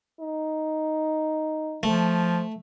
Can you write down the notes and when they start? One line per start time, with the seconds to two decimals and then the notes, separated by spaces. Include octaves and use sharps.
0.20 D#4
1.83 F3 A3